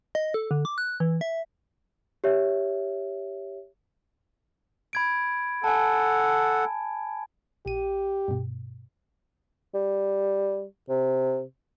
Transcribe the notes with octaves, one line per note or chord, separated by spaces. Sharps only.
D#5
A4
D3
D6
F#6
E3
E5
G4 C#5 E5
B5 G#6 D7
A4 F#5 G#5 A5
A#1 G4 D#7
G2 B2
G3
C3